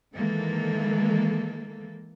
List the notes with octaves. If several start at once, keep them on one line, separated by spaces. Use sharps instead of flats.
D#3 E3 G#3 A#3 A4